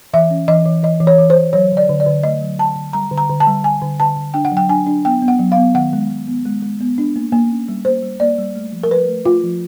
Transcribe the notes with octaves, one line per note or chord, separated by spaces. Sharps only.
E3 E5
C#4
E3 D#5
E3
E3 D#5
E3
C#5
E3
C5
E3
F#3 C#5
D3
D5
D3
D5
D3
A3 D#5
F#3
D3 A5
D3
G3 A#5
D3
A#5
D3
A5
G3
D3 G#5
D3
D3 A5
D3
D4 G5
F#5
F#3 G5
D4 G#5
D4
B3 G5
B3
F#5
F#3
B3 F5
D#3 F#5
G#3
G#3
B3
G#3
G#3
B3
D4
A#3
A#3
C#4
G3
A#3 C5
G3
A#3 D5
G3
A3
F3
A#4
F3 B4
A3
A3 F4
F3